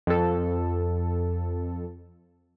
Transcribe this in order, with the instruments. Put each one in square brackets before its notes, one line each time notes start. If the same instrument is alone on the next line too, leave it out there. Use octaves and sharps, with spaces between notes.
[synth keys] F2 A4